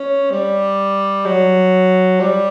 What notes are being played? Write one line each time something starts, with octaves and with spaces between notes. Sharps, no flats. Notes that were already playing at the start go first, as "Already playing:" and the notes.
Already playing: C#4
G3
F#3
G3